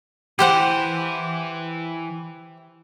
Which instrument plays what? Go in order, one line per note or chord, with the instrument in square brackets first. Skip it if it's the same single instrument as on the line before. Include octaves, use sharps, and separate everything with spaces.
[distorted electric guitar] E3 B4 [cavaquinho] G4 C5 F#5